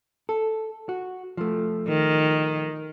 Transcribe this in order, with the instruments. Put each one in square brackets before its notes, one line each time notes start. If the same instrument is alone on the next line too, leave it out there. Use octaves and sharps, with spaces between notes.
[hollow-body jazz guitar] A4
F#4
F3 A3
[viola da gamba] D#3